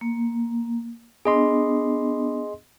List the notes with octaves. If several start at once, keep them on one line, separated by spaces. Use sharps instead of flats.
A#3
B3 D4 G#4 D#5 C6